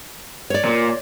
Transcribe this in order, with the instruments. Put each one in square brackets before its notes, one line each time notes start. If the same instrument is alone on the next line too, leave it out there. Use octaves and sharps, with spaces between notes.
[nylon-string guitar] C#5 D5
[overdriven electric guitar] A#2